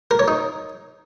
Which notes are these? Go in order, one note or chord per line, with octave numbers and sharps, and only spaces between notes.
A#4
C#5
D#4